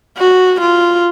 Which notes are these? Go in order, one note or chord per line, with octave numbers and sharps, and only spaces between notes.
F#4
F4